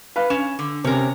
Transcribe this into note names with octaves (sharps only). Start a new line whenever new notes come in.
B4 F5 B5
C#4 E7
D3
C3 C#4 A#4 C#5